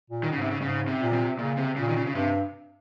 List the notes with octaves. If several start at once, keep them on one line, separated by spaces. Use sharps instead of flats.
A#2
D#3
C#3
G#2
C3
C#3
G#2 C#3
C3
A#2
C3
A#2 C#3
C3
A#2 C#3
D#3
C#3
C#3
G2 C3